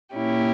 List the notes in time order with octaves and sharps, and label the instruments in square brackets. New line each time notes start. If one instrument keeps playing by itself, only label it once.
[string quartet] A#2 A#3 C#4 E4 G4